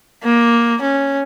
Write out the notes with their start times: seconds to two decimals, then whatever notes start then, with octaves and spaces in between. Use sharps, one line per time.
0.24 A#3
0.82 C#4